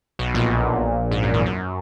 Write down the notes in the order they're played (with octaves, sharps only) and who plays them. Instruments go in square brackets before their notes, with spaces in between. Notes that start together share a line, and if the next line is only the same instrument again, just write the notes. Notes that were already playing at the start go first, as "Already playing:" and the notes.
[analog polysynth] B1 B2
A#1 A#2
G#2
F#2
E2
F#2